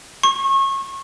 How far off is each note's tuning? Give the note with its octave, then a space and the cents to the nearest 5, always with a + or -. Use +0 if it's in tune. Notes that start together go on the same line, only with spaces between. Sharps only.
C#6 -25